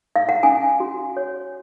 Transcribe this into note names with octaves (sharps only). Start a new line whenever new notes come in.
F5
F#5
C#4 G#5
F#4
C#5